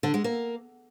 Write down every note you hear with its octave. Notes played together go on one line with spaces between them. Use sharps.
D3
G#3
A#3